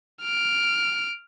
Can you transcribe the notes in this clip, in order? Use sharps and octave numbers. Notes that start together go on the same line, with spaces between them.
F6 D7